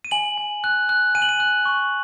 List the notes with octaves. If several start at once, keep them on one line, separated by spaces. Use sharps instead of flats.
D#7
G#5 F#7
G#5
F#6
F#6
G#5 D#7
F#7
D#7
F#6
C#6